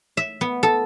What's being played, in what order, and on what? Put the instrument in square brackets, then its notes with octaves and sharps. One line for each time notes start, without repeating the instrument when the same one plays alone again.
[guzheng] E5
B3
A4